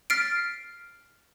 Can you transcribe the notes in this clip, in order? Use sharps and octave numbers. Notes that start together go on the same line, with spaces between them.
F6 A6 B6 C7 D7